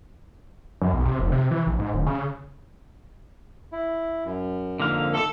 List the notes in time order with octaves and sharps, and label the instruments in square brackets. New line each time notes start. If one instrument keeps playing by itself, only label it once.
[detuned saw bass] F#2
B1
C3
F1
C3
E3
A#1
G#2
D1
C#3
[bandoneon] E4
F#2
[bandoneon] F2 G#2 [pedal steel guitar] D3 A#3 F5
[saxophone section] A4